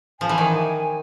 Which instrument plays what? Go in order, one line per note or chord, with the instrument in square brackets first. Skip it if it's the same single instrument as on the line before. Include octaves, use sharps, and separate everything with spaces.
[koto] F3 [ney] G#5
[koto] E3
D#3